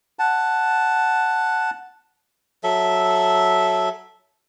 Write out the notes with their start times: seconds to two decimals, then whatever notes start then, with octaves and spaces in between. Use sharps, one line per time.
0.19 F#5 A5
2.64 F#3 A4 E5